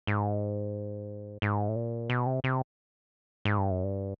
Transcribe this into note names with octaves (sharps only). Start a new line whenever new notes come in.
G#2
G#2
A2
A#2
B2
C3
C3
G#2
G2
F#2
G2